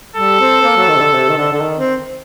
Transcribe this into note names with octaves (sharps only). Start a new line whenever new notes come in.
G3 A4
C4
C4
A#3
F#3
D#3
C3
D3
C3
D#3
D3
D3
D#3
C4